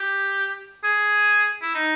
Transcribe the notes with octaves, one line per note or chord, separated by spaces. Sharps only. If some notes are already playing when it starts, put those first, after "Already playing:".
Already playing: G4
G#4
E4
D#4